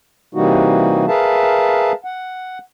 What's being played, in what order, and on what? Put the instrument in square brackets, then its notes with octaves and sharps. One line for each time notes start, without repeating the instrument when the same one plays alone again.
[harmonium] C3 E3 G3 A#3 D#4 F#4
G#4 A#4 B4 E5 F5 A5
F#5